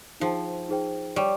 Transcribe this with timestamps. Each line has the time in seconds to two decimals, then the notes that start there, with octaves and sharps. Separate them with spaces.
0.20 F3 D#4 G#4 C5 G5
0.69 D#4 G#4 C5 G5
1.16 G3 C#5 G5 C#6